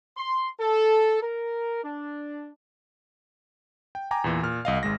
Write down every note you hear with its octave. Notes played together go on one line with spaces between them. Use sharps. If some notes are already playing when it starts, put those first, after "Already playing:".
C6
A4
A#4
D4
G5
G5 G#5 A#5 D6
E2 A#2 E3
A#2 F6
C2 D#5 F5
G#1 G#3 A#6